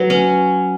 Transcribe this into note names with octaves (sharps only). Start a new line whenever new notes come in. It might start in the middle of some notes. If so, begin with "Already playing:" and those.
Already playing: F#3 B4
C#4